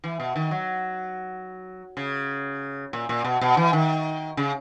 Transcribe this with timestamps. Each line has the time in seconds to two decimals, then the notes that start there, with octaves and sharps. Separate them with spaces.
0.04 E3
0.20 B2
0.36 D#3
0.51 F#3
1.97 C#3
2.93 A#2
3.09 A#2
3.24 B2
3.41 B2
3.57 E3
3.73 D#3
4.37 C#3